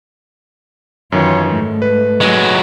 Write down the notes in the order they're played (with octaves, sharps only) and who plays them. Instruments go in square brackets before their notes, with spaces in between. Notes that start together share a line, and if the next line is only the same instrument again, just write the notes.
[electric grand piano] F#2 D#3 E3 [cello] F4 C#5
[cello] G#2 A3
[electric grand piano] B4
[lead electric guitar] F#3 G#3